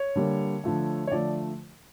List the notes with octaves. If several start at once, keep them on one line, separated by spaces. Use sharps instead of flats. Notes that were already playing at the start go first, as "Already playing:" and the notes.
Already playing: C#5
D3 G3 A#3
D3 F3 A3
C#5
D3 F3 A3 D5